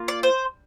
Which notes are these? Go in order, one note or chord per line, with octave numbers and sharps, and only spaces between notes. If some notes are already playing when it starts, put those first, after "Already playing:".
Already playing: A#3 F4
D5
C5